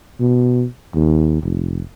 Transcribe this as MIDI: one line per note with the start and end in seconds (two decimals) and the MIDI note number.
0.20 0.66 47
0.94 1.38 39
1.43 1.82 29